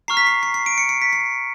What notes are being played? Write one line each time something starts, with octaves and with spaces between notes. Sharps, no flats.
A#5 C#6 F6 C7
B6
C7
C7
C7
D7
C#7
C7
B6
C7